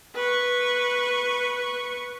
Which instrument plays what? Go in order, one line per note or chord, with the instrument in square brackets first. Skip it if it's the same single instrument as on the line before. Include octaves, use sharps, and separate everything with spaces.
[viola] B4 C#6